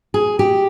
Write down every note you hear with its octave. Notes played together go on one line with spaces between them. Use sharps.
G#4
G4